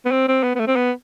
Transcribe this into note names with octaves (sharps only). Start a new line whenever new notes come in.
B3
C4
C4
B3
B3
A3
C4
B3